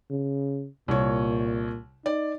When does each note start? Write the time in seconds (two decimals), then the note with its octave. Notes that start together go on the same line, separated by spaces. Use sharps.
0.10 C#3
0.88 C2 A#2 C#5
2.06 D#4 D5